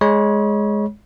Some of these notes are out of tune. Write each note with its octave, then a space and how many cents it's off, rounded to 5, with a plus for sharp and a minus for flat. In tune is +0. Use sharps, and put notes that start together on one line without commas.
G#3 +5 C#5 +0 B5 -40